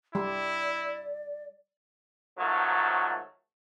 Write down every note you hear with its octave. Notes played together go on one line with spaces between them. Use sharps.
G3 E4 D5
G#2 D#3 F3 F#3 A3